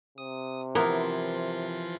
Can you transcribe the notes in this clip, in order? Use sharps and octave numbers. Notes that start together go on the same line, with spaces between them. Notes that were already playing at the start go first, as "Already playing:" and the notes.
C3 D#6
E3 F3 A#3 B3 E4 F4 A#4